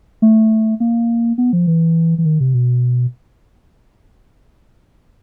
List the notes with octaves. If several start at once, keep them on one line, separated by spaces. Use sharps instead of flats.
A3
A#3
B3
F3
E3
E3
D#3
C3
B2